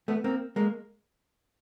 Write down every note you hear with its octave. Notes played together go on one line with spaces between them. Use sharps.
A3 B3
A#3 C4
G#3 A#3